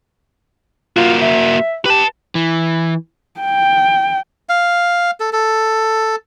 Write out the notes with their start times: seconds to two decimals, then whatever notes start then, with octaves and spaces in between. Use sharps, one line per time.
0.97 A#3 F4 F#4
1.22 E5
1.86 G4 B4 A5
2.35 E3
3.40 G5
4.49 F5
5.20 A4
5.33 A4